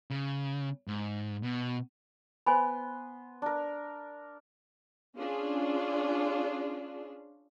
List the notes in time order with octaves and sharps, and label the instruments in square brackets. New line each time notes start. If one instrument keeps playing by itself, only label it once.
[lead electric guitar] C#3
G#2
B2
[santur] B3 C6 [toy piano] C5 G#5 B5
[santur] D4 A#4
[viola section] C#4 D4 F4 G#4